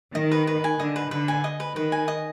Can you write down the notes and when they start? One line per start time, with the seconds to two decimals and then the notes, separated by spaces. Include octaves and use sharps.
0.15 D#3 D#5
0.31 B4
0.47 B4
0.64 G#5
0.80 D3 D#5
0.96 B4
1.11 D3 B4
1.28 G#5
1.44 D#5
1.60 B4
1.76 D#3 B4
1.92 G#5
2.08 D#5